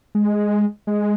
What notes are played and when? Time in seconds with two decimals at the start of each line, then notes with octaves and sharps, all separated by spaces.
0.15 G#3
0.87 G#3